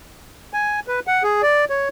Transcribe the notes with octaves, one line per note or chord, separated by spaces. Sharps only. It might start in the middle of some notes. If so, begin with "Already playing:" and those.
G#5
B4
F#5
G#4
D5
C#5